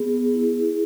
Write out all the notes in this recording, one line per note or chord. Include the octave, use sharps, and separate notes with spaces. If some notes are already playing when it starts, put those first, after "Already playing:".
Already playing: B3 G#4
E4